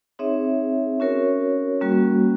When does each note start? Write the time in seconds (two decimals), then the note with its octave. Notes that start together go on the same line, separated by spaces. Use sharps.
0.19 C4 D#4 G#4 C#5 E5
1.00 C#4 F#4 A#4 C#5
1.81 G3 A#3 C#4 F#4